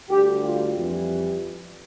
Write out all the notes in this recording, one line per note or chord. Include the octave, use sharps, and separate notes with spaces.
D2 D3 G3 G4
F4
F2 E3 G3